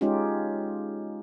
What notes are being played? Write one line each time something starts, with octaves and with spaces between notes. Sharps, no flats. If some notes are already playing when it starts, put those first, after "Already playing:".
G#3 C#4 D#4 F4 G4